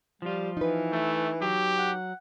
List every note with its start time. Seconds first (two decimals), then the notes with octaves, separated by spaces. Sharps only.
0.22 F3 G3 F4
0.57 E3 D#4 B4
0.92 A3
1.42 F#3 G4
1.78 F#5